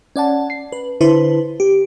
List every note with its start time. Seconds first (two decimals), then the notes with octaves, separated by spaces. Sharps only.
0.16 C#4 D5 F#5 A5
0.50 C7
0.72 B4
1.01 D3 E4 B4 C5 A5 C6
1.60 G4